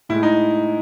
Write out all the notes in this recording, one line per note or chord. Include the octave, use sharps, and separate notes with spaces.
A2 G#3 E4
D#4